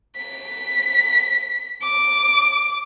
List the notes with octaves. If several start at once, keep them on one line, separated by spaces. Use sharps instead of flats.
B6
D6